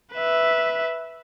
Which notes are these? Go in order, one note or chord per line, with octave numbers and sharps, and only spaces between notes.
B4 E5